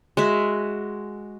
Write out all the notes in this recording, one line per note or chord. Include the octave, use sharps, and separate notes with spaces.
G#3 F#4 E5